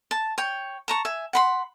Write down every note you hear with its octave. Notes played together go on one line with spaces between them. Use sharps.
A5
C#5 G5
A5 A#5 C#6
E5 G#5
F#5 B5 C6